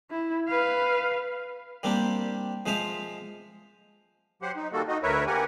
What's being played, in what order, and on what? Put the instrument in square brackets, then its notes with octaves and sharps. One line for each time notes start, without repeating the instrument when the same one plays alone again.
[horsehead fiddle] E4
B4 F5
[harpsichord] G3 A#3 C4 D4 G4
F3 G#3 C5 E5 F5
[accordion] F#3 G4 C5 F#5
D#4
D#3 G3 A#3 F#4 A4
D#4 F#4 D#5
D2 A#4 B4 C#5 E5
A#3 G4 A#4 F#5 G#5